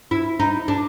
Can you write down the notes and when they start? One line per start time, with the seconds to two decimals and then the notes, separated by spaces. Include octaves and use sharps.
0.11 E4
0.39 D#4
0.68 D4